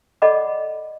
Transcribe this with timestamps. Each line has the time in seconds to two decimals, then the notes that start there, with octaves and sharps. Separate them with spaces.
0.22 A4 D5 D#5 F#5 B5 D6